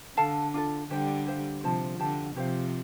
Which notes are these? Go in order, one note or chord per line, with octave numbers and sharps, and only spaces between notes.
D3 A4 F5 A5
D4 F4 A4
D3 G3 G4 C5 G5
G4 C5 F5
C3 F3 F4 C5 A5
D3 G4 F5 A5
C3 F3 G4 C5 F5